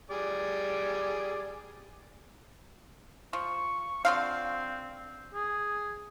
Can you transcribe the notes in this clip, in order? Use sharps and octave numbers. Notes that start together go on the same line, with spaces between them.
G3 G#4 D5
F3 C#6
D3 F3 C4 F5
G#4